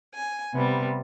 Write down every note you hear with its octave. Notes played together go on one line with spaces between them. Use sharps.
G#5
C3 G3 B3